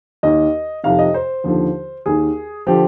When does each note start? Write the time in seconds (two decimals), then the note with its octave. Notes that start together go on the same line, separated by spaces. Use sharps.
0.23 D#2 D#3 D#5
0.83 F2 C3 D#3 F5
0.99 D#5
1.14 C5
1.44 D#2 D3 F3
2.06 D#2 D#3 G#4
2.67 D3 F3 G4